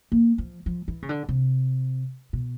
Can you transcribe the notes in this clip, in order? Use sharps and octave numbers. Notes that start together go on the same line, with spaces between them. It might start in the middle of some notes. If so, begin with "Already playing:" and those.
A#3
F3
F3
E3
C#3
D3
C3
B2